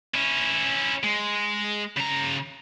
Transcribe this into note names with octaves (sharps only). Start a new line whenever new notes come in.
C#4 E4
G#3
C#3 A#5